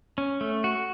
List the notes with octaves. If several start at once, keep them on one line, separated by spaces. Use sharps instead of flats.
C#4
A3
F#4